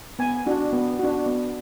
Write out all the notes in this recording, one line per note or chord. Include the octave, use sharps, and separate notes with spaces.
B3 G#5
D4 F#4
B3
D4 F#4
B3